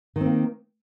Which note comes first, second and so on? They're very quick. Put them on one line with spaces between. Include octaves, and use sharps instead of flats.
D#3 C4 A#3